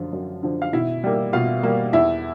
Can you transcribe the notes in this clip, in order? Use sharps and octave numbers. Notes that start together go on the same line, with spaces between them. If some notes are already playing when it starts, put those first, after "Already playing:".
Already playing: F#2 D3 F3 F4
F#2
D3 F3
F5
B2 E4 E5
G3 A#3
B2 F4 F5
G3 A#3
E2 E4 E5